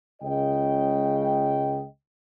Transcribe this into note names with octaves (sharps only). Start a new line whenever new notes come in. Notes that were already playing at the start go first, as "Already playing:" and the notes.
C#2 C#3 D#5 G5